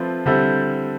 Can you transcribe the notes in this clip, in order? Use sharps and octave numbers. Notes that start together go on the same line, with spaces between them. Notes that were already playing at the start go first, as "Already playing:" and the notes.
Already playing: F3 A3 C4 F4 B4
D3 G3 C4 E4 A4